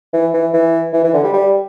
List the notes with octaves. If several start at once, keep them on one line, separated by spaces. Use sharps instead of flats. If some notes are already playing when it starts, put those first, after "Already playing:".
E3
E3
E3
E3
E3
D3
G3
G3